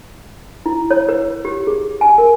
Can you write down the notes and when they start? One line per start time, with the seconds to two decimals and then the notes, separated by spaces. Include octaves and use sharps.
0.66 E4
0.91 C#5
1.09 B4
1.45 G4
1.67 G#4
2.01 G#5
2.18 A#4